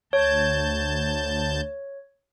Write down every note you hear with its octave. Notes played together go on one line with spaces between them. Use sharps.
D2 C#5 A5 G6